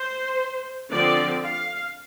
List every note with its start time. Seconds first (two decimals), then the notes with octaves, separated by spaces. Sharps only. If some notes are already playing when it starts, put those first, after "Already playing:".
Already playing: C5
0.91 D3 F3 C4 D5
1.43 F5